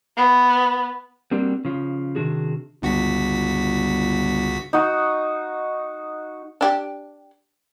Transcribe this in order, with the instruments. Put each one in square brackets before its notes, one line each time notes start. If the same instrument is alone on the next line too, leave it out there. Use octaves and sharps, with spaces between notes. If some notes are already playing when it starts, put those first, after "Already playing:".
[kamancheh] B3
[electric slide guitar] G3 A#3 C4 D4 F#4
C#3 F3
C3 D#3 D4 F#4 G#4
[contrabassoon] G1 [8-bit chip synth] C#2 F#4 B6
[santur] D#4 F#4
[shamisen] D4 G4